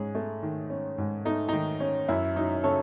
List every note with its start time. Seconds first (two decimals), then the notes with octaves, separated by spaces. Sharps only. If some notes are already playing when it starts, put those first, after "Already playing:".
Already playing: G#2 C#4 G#4
0.15 A3
0.43 D#3
0.70 C#4
0.98 G#2
1.25 A3 D#4
1.49 D#3 D#4
1.80 C#4
2.09 F#2 E4
2.36 F#3 D#4
2.63 C#3 A4 C#5